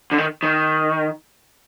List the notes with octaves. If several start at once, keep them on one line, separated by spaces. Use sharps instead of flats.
D3
D#3
D#3